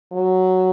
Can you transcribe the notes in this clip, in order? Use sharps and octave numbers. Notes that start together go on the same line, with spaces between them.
F#3